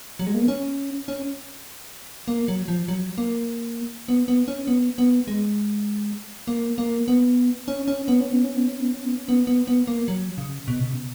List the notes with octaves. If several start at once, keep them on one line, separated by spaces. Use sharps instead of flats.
F#3
G#3
A#3
B3
C#4
C#4
A#3
F#3
F3
F#3
A#3
B3
B3
C#4
B3
B3
G#3
A#3
A#3
B3
C#4
C#4
B3
C#4
B3
C#4
B3
C#4
B3
C#4
B3
C#4
B3
B3
B3
A#3
F#3
C#3
B2
C#3
B2